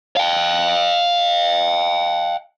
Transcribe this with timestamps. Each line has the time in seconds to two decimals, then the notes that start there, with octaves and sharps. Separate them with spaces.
0.17 F5 G5